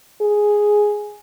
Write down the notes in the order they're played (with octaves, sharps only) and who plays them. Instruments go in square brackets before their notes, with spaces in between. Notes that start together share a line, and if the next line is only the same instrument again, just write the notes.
[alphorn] G#4